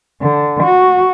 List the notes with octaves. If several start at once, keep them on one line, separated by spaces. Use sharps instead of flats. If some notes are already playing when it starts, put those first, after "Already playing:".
D3
F#4